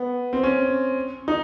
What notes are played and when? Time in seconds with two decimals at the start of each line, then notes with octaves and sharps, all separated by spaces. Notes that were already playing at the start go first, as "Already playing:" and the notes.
Already playing: B3
0.33 C4
0.43 C#4
1.28 D#4